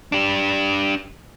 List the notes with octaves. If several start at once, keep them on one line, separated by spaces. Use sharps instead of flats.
D4 G4